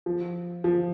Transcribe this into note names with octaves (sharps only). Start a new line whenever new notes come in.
F3
F3